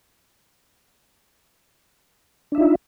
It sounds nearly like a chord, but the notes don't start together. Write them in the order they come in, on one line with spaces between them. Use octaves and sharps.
D4 E5 D#4 F4